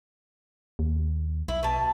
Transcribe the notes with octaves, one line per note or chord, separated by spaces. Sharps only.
D#2
B1 E4
B2 A5